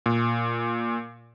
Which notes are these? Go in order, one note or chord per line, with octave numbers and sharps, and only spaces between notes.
A#2